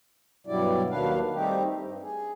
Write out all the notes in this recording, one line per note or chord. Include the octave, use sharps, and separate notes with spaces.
G2 B2 F#3 G3 E4 D5
D#2 D#3 F#3 D4 B4 F5
G3 A3 C4 D#4 G4
G2
G#4